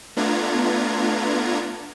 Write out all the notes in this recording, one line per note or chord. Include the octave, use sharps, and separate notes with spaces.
A3 B3 D4 F4 A#5 G#6